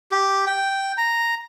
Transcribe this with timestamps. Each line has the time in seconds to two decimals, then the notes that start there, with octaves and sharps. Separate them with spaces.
0.11 G4
0.46 G5
0.98 A#5